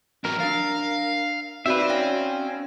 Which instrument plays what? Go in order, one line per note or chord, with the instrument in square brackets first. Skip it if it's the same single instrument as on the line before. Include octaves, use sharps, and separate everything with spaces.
[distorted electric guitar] F#3 D4 [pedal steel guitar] A#4
[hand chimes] D4 A6 [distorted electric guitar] F5
[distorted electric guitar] C4 [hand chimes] D#4 F#4 D5 [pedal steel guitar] B4 E5
[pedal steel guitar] C#4 [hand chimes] F5 G5 A#6